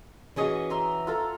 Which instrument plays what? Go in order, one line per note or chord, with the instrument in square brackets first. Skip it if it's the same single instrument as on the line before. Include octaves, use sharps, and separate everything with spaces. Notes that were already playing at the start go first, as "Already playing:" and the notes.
[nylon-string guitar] E3 C#4 G#4 [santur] F#4 D#5 C#6
[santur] E5 A#5 C6
F4 A4 A#5